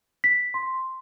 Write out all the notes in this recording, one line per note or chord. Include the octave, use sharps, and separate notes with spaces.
B6
C6